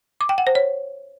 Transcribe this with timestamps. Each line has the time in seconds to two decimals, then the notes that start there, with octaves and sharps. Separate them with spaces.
0.21 D6
0.29 G5
0.38 F#5
0.47 C5
0.55 C#5